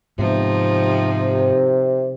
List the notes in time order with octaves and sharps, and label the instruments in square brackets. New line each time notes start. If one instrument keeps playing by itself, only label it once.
[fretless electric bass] G#2 B3 [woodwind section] C3 [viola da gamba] F3 D#4